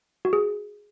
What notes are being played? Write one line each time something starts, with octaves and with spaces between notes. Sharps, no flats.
F#4
G#4